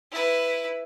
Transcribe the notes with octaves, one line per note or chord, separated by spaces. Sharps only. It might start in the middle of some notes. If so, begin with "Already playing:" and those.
E4 B4